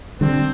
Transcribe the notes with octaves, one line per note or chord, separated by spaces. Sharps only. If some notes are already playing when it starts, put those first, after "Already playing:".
D3 G3 C4